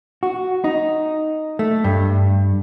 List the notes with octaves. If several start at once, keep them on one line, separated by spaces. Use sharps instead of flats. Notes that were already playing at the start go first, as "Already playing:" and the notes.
F#4
D#4
A3
G2